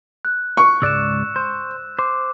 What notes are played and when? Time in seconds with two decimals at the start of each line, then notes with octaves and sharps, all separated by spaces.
0.25 F#6
0.57 C#6
0.82 C#2 G#2 D5 E6 F#6 E7
1.36 C5
1.99 C5 D6